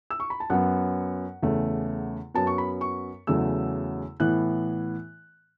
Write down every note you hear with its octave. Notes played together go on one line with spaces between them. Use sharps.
E6
C#6
B5
A5
F#2 F#3 B3 F#5
E2 C#3 A3
F#2 F#3 B3 A5
C#6
B5
C#6
E2 C#3 F#3 A3 E6
A2 E3 B3 F#6